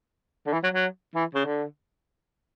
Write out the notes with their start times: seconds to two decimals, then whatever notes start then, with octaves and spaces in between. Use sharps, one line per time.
0.46 D3
0.53 E3
0.64 F#3
0.74 F#3
1.15 E3
1.35 C#3
1.45 D3